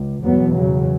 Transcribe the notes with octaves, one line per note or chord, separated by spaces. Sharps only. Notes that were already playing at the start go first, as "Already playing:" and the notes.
Already playing: C#2
E2 B2 F#3 B3
C#3 F#3